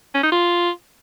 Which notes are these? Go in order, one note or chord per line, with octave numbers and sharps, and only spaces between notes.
C#4
D#4
F4